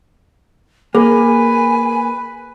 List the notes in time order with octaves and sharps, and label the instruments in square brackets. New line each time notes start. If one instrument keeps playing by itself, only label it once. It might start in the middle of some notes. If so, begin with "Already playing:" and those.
[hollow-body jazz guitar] A#3 [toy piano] G#4 [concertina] B4 [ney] G#5